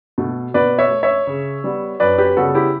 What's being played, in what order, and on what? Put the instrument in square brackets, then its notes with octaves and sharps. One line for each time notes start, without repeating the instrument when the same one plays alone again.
[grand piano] B2 A3
B2 B4 D5
C#5 E5
A3
C#5 E5
C#3
G3 B3
F#2 B4 D5
G4 B4
C#3 G3 B3 F#4 A4
E4 G4